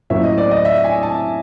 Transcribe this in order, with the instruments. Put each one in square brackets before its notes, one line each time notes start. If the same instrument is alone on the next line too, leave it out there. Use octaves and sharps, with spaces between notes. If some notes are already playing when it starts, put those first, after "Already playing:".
[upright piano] A2 F#3 A#3 C#4 E5
D#5
D5
D#5
E5
G#5
A5